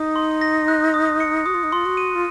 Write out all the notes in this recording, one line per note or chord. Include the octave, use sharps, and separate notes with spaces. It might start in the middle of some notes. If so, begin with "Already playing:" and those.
Already playing: D#4 D#6
C6
A#6
F#6
D#6
C#7
F#4 D#6
F4
D#4
F4 C6
F#4
D#7
F4